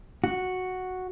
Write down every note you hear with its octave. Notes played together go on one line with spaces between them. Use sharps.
F#4